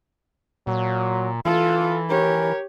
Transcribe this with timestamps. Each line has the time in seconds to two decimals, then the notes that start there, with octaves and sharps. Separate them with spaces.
0.67 A#2 F#3
1.45 E3 F4 A4
2.10 G4 A#4 C#5